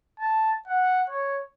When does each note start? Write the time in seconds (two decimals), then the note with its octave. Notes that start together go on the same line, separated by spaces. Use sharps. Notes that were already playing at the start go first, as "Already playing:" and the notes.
0.20 A5
0.68 F#5
1.10 C#5